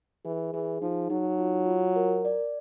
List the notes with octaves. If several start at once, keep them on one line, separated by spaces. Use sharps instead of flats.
E3 G#4
E3 G#4
F3 D#4
F#3 D#4
F4
F4
A#4
D5